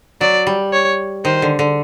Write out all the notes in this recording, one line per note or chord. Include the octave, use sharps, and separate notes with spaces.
F#3 D5
G3
C#5
D#3 C5
D3
D3